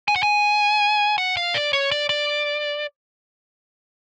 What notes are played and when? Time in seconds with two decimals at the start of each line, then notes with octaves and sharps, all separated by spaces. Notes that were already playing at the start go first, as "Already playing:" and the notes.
0.08 G#5
0.16 F#5
0.23 G#5
1.18 F#5
1.37 F5
1.54 D5
1.73 C#5
1.91 D5
2.09 D5